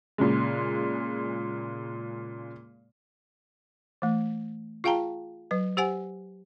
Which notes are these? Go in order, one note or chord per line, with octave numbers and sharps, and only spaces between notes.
A#2 C#3 G#3
E3 A3
F4 G#4 F5 G5 A5 A#5
F#3 B4
G4 C5 F#5 G#5